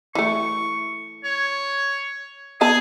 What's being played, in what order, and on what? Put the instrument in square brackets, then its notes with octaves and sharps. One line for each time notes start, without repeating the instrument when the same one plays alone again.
[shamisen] E3 A3 [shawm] C#6
[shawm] C#5
[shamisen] B3 A4 A5 [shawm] G#4